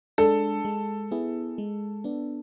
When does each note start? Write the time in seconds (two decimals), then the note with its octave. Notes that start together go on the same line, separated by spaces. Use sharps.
0.18 G#3 D4 A4
0.65 G#3
1.11 B3 E4 G#4
1.58 G#3
2.04 B3 D4